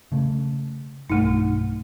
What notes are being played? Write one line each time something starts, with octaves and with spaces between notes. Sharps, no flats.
C#3 A3
B1 G2 A3 D#4